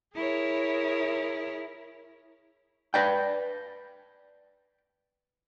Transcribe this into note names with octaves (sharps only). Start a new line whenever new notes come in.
E4 G#4 A#4 C#5
B4 D5 G5